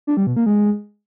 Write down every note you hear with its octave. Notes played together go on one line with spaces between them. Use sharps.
D4
G3
B2
A#3
G#3